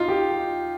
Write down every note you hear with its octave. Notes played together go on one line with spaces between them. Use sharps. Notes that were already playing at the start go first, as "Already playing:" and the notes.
Already playing: D#4 F4
G4